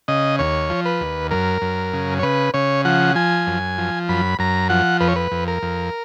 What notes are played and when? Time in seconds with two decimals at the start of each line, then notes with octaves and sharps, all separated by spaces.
0.08 C#3 D#5
0.39 D#2 C#5
0.70 F3
0.85 B4
1.01 D#2
1.31 F#2 A#4
1.62 F#2
1.93 C#3
2.19 C#5
2.23 C#3 B4
2.54 C#3 C#5
2.85 F3 F#5
3.15 F3 G#5
3.47 F#2
3.78 F3
4.09 F#2 B5
4.39 F#2 A#5
4.70 F3 F#5
5.01 F2 B4
5.08 C#5
5.16 B4
5.32 F2
5.48 A#4
5.62 F2